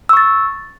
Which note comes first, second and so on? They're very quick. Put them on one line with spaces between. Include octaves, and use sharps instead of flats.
E6 C#6 A6